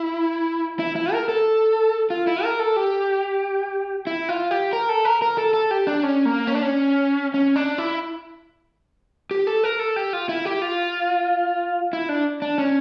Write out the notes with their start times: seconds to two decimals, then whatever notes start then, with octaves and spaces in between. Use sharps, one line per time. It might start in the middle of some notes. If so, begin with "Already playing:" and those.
Already playing: E4
0.79 E4
0.96 E4
1.13 A#4
1.29 A4
2.10 F4
2.27 E4
2.44 A#4
2.59 A4
2.76 G4
4.07 E4
4.29 F4
4.51 G4
4.73 A#4
4.89 A4
5.05 A#4
5.22 A#4
5.38 A4
5.54 A4
5.71 G4
5.87 D4
6.03 C#4
6.25 A#3
6.47 C#4
6.55 D4
6.63 C#4
7.34 C#4
7.56 D4
7.78 E4
9.31 G4
9.47 A4
9.64 A#4
9.79 A4
9.96 G4
10.13 F4
10.29 E4
10.45 G4
10.62 F4
11.93 E4
12.09 D4
12.42 D4
12.58 C#4